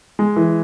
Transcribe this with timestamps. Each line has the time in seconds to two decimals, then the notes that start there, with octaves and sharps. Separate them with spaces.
0.19 G#3
0.36 E3